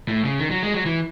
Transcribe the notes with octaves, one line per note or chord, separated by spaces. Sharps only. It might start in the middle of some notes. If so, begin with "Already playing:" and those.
A2
C#3
D#3
F#3
G#3
F#3
E3